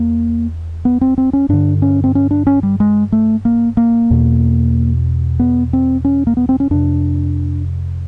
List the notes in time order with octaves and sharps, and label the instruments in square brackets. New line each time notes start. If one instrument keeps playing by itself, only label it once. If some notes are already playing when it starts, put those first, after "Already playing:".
Already playing: [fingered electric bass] E2 A#3
B3
C4
C4
C#4
G2 D3 D4
C#4
C4
C#4
D4
C#4
G3
G#3
A3
A#3
A#3
E2 B2
B3
C4
C#4
A#3
B3
C4
C#4
F2 C3 D4